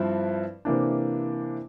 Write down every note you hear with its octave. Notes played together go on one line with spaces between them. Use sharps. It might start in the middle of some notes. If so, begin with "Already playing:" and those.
Already playing: G2 F3 C4 E4
C3 E3 A#3 D4